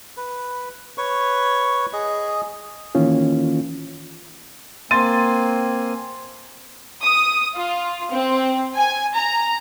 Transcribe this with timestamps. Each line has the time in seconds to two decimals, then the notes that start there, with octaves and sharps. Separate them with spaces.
0.17 B4
0.98 B4 C#5 C#6
1.93 G#4 D#5
2.95 D#3 E3 A#3 C#4 F4
4.91 A#3 C4 G#5 C6 A6 D#7
7.04 D#6
7.55 F4
8.11 C4
8.75 G#5
9.15 A#5